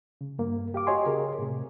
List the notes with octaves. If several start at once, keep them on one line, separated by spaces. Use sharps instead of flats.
C#3
G2 A#3
G4 F5 D6
F#4 G4 C#5 D#5 G#5 C6
C#3 G#4 A#4
A2 C3